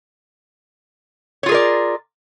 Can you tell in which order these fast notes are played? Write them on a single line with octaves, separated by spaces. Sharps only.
C#5 F4 G#4 A#4 D5